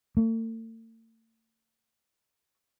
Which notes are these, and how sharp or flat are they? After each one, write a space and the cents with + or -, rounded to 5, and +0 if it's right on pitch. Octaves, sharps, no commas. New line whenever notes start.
A3 +45